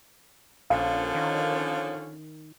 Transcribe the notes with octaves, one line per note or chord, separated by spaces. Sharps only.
A#1 D3 F3 C#4 F5
D#3